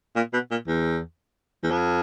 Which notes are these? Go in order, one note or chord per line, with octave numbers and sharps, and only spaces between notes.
A#2
B2
A#2
E2
E2
F2